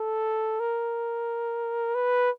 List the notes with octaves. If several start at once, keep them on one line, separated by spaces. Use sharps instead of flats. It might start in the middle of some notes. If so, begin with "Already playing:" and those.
Already playing: A4
A#4
B4